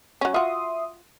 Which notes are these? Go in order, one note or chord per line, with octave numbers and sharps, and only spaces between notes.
F#3 C#4
F4 F#4 E5 C6 D#6